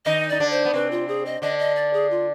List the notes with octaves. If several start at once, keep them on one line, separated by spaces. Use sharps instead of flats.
D#3 D#4 D#5
D#4 D5
D3 D4
C5
B3
C3 C4 B4
F4
G#4
D#5
D3 D4 D#5
D#5
D5
G#4
F4